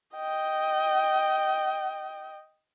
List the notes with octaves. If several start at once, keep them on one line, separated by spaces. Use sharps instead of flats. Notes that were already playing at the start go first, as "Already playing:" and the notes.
D#5 G5